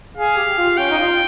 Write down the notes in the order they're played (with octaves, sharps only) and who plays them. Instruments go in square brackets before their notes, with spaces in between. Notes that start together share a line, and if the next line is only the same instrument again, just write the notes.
[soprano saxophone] G#4 [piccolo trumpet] F5
[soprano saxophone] G4
F4
[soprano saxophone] C#4 [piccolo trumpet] G5
[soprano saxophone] D#4
F4